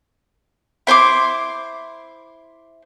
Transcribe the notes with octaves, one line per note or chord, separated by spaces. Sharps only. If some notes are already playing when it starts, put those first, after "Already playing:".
E4 C5 C6 D6